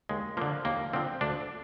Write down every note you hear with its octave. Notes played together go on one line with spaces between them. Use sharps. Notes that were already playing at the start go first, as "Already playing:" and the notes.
D#2 G#3
D3 F3 A#3
D#2 A#3
D3 F3 C4
D2 D4